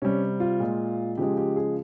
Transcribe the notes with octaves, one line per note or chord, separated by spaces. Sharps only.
C3 G3 C#4
F4
A#2 G#3
C#3 F3 G#3 G4
G4
G#4